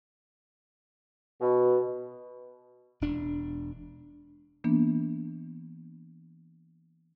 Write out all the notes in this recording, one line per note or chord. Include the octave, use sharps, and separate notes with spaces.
B2
E1 D4
E3 A#3 B3 D4